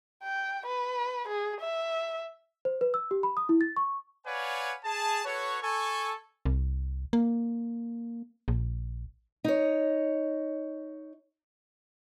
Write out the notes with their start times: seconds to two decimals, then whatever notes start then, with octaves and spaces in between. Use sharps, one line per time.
0.23 G5
0.66 B4
1.28 G#4
1.60 E5
2.65 C5
2.81 B4
2.94 E6
3.11 G4
3.23 B5
3.37 D#6
3.49 E4
3.61 A6
3.77 C#6
4.26 B4 C#5 D5 F5 F#5 G#5
4.85 G#4 A5
5.25 F#4 A4 B4 C#5
5.62 A4 G#5 C#6
6.46 C2
7.13 A#3
8.48 A#1
9.44 D#4 C#5